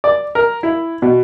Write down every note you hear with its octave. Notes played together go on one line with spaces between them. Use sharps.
D5
A#4
E4
B2